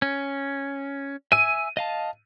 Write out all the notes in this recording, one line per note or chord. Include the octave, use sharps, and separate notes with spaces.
C#4
E5 G#5 E6 D#7
D#5 F5 A5